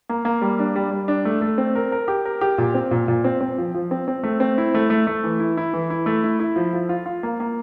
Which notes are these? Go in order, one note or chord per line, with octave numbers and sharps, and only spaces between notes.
A#3
A#3
G3
D4
G3
G3
D4
A3
A3
C4
A#4
A#4
G4
A#4
G4
A#2
C4
A#2
A#2
C4
C4
F3
F3
C4
C4
A3
C4
E4
A3
A3
A3
E3
E4
E4
E3
E4
A3
E4
E4
F3
F3
F4
F4
A#3
A#3